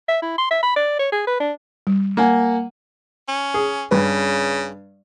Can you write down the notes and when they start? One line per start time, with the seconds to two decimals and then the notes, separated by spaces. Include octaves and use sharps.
0.08 E5
0.22 E4
0.38 C6
0.51 E5
0.62 B5
0.76 D5
0.99 C#5
1.12 G#4
1.27 B4
1.40 D4
1.87 G3
2.17 A#3 F#5 G#5
3.28 C#4
3.54 G#4
3.91 G2 C#3 B4